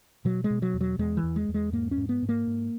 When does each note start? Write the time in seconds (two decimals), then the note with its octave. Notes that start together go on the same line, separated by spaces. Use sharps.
0.25 B2 F#3
0.44 G#3
0.50 B2
0.62 F#3
0.74 E2
0.81 F#3
0.99 E2 G#3
1.17 E3
1.23 E2
1.36 G#3
1.49 E2
1.54 G#3
1.72 G#2 A#3
1.91 C#4
1.97 G#2
2.09 B3
2.22 G#2
2.29 A#3
2.47 G#2